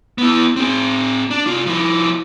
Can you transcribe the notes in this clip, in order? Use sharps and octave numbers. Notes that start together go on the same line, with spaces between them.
B3 E4
C4 G#4
D4
C3 F4
F3 E4